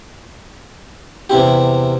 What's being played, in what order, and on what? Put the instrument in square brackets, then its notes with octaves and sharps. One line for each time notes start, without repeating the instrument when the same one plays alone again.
[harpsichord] E2 C3 E4 G4